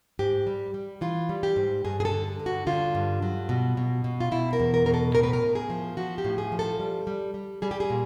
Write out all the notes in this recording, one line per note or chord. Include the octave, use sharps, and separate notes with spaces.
G#2 G4
G3
G3
E3 F4
G3
G4
G#2
G2 G#4
G#4
A4
D3
G2
F#4
D3 F4
G2
F#3
B2
B2
B2
F4
B2 E4
A#4
E2
A#4
B2 A#4
A4
A2 A#4
B4
A#4
A2
G#4
F3
F3 F#4
G4
A2
G#4
F3
A4
G3
G3
G3
G3 G#4
G4
G#4
A#2